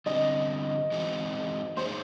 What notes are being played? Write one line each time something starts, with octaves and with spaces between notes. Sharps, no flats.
D3 G3 C4 D#5
E3 G#3 C4 D#4 F#4
A#3 D#4 G#4 C5 C#5